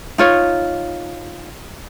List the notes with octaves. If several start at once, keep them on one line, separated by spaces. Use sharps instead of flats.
D#4 F4 C#5